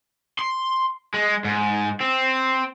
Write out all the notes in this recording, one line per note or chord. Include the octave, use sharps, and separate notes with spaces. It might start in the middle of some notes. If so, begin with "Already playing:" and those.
C6
G#3
G#2
C4